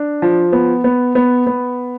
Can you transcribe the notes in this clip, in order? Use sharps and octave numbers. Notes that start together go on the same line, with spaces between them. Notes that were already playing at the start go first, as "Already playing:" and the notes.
Already playing: D4
F3
B3
B3
B3
B3